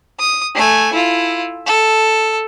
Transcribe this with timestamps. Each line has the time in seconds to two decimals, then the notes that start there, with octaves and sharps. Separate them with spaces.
0.19 D#6
0.55 A3 G#5
0.93 E4 F4
1.66 A4